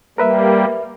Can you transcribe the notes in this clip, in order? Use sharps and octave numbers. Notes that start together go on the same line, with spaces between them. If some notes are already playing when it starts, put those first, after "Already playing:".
G3 A#3 A#4 B4 E5